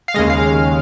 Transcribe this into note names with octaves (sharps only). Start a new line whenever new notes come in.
F5
D#2 C#3 G#3 D#5
F5